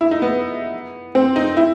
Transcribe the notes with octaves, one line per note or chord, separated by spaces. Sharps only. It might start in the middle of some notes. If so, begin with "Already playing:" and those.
E4
D#4
B3
C4
D#4
E4